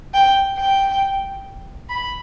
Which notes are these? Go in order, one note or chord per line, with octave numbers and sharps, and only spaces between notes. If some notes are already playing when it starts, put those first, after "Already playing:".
G5
G5
B5